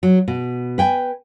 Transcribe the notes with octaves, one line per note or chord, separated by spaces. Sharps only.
F#3
B2
B4 G5 G#5